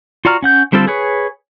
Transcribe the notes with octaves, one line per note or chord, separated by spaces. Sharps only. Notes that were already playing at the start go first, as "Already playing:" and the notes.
F4 F#4 D5 A#5 F6
C#4 F#5 G6
D3 G3 C4 F4 A4
G#4 B4 C#5